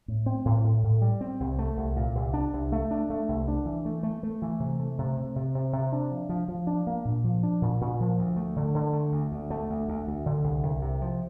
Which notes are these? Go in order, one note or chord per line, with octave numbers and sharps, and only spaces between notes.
A2
C4
A2
A2
A2
G3
C4
C2
A3
C2
A#2
C2
D4
C2
A3
D4
A3
C2
D4
E3
A3
A3
A3
E3
C3
A3
C3
C3
C3
C3
C3
D4
F3
F3
F3
D4
A#3
A#2
F3
D4
A#2
A#2
F3
D2
A3
D3
D3
A3
D2
D2
A3
D2
D2
D2
D3
C2
C2
C3
F3